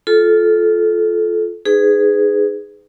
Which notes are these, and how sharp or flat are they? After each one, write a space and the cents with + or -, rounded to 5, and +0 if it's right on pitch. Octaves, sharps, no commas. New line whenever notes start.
F4 +0 A4 -20
D#4 -5 G#4 +0 B4 +35